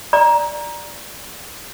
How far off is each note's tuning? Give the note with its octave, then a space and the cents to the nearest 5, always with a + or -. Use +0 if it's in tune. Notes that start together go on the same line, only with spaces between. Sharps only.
D5 +5 A#5 +15